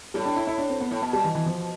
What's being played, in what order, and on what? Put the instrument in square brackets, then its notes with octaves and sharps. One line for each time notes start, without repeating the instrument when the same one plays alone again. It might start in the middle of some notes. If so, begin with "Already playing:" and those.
[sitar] A2 [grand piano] G3
[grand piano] D4
E4
E4
D4
C4
B3
[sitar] A2
[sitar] B2 [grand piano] B3
[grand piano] G3
E3
E3
F3